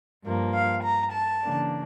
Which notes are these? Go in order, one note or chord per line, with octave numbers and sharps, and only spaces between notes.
G2 F3 A#3
F5
A#5
A5
C#3 E3 A#3 D4